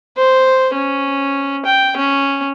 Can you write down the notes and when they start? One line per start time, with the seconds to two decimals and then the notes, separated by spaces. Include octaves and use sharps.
0.17 C5
0.74 C#4
1.65 G5
1.97 C#4